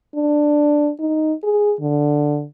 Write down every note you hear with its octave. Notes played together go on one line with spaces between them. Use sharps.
D4
D#4
G#4
D3